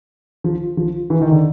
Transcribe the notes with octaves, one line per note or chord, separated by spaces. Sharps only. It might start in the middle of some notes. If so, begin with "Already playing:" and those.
F3
F3
E3
D#3
D3